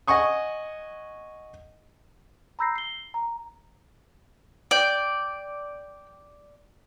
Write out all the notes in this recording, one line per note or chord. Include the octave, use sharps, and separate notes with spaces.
D#5 F#5 G#5 C#6 D#6
A#5 B5 E6 G6 A#6 C7
C7 G7
A#5
D5 G5